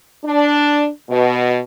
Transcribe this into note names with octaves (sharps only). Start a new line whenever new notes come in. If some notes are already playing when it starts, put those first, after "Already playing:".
D4
B2